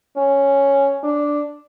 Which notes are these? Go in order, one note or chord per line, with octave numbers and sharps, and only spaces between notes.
C#4
D4